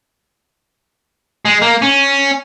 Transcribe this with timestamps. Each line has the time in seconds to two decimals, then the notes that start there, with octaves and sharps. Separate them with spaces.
1.45 G#3
1.62 A#3
1.82 C#4